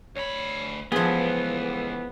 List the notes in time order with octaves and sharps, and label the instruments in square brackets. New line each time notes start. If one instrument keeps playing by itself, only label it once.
[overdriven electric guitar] D2 B5 [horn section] C#5
[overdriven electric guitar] C#2 [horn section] A2 E3 [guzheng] F3 G#4 [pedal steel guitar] B3